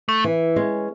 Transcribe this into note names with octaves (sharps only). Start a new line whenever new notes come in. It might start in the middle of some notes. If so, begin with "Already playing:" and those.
A3
E3
G#3 C#4